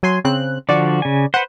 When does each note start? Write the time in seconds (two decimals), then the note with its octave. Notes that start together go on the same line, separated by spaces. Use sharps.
0.03 F#3 G#5 C6
0.24 C#3 C4 F#6
0.69 D3 F3 F#4 D5
1.02 C#3 G#5
1.34 B4 C5 F#5